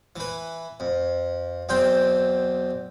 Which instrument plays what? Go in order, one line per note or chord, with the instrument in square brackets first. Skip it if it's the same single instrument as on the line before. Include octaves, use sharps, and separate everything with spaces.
[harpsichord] E3 B4
F2
B1 E2 C4 G5